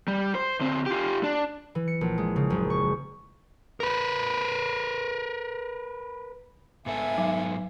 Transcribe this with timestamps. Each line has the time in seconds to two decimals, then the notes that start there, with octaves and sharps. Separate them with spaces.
0.08 G3
0.35 C5
0.60 D3 C4
0.86 F4 G4
1.23 D4
1.75 E3
1.88 C#7
2.01 A#1
2.18 G#3
2.36 C#3
2.50 F#1
2.70 C#6
3.80 A#4 B4
6.86 G#2 B3 A4 E5 G#5
7.18 F#3